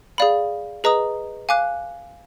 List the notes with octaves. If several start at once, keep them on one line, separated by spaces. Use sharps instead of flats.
G#4 D5 F5 B5
G#4 B4 D#5 A#5 D#6
F5 G#5 D6 F#6